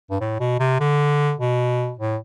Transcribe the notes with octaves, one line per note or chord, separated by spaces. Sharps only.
G2
A2
B2
C3
D3
B2
A2